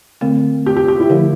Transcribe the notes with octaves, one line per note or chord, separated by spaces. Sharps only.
D3 A3 C4
G4
G4
G4
E4
D3 F3 A3